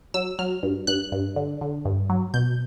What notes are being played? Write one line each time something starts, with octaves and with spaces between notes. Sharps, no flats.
F#3 E6
F#3 F6
G2
G2 F#6
G2
D3
D3
G2
F#3
B2 G6